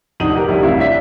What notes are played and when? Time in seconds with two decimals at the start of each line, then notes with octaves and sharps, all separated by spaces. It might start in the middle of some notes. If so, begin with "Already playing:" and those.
0.20 F1 D3 D4 D#4 D#7 F#7
0.36 G4 A#4
0.48 F1 G3 E4
0.62 A1 C3 E4 E5 F5
0.79 D4 E5 B6